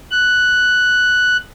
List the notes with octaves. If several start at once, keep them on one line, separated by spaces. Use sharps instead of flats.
F#6